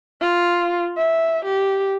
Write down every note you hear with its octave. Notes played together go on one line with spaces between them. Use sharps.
F4
E5
G4